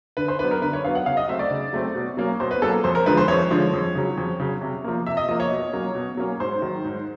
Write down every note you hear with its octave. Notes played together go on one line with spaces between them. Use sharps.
D3 B4
C5
F#3 B3 D4 B4
A#4
D3 B4
C#5
F#3 B3 D4 F5
F#5
C#3 F5
D#5
F#3 A3 C4 E5
D5
C#3
F#3 A3 C4
B2
F#3 A#3 C#4
B2 C5
B4
F#3 A#3 C#4 A4
F2 C5
A#4
D3 F3 G#3 B4
C5
F2 C#5
D3 F3 G#3
F2
C#3 F#3
F2
C#3 F#3
C3
F3 A#3
C3 E5
D#5
F3 A#3 D#5
C#5
B2
F#3 A#3 C#4
B2
F#3 A#3 C#4
G#2 C5
D#3 F#3
G#2